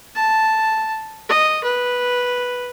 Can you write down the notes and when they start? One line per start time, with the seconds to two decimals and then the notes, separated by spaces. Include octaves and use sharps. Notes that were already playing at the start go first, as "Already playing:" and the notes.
0.16 A5
1.29 D#5
1.64 B4